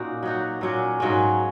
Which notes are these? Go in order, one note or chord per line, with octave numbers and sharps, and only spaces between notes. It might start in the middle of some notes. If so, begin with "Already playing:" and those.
Already playing: A#2 A#3 C#4 D#4 F#4
F#3 D#4 F#4
A#2 F#3 C#4
G#2 F#3 A#3 C#4